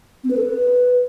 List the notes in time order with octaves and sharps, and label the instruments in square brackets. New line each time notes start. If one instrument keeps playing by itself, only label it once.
[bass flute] C4
B4
A4
B4